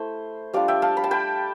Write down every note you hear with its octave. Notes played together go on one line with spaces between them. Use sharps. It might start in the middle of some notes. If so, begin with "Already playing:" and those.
Already playing: A3 E4 C5
G3 D4 F4 D5 F5
E5 G5
F5 A5
B5
A5
G5 B5